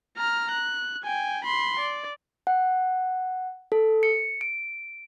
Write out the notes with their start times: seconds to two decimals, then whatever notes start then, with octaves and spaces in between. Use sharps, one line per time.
0.17 A#5 F6
0.51 F#6
1.04 G5 G#5
1.44 B5 C6
1.79 D5
2.47 F#5
3.72 A4
4.03 C#7
4.41 D7